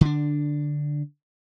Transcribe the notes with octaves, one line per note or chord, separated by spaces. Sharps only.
D3 D4